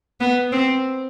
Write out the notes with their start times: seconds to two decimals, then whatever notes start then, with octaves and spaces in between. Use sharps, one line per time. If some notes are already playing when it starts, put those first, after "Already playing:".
0.20 B3
0.52 C4